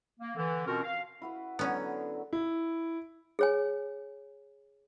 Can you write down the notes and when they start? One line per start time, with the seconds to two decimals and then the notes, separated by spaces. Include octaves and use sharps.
0.20 A#3
0.36 D3 E3
0.66 B2 C4 C#4 F4 F#4 A#4
0.81 F5
1.22 E4 F#4 B4
1.59 D3 F#3 B3 C#4
2.33 E4
3.39 G#4 C#5 G#5